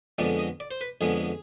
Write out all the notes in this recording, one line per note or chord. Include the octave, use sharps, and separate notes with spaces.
F2 D3 G#3 B3 D5
D#5
D5
C5
B4
F2 D3 G#3 B3 G#4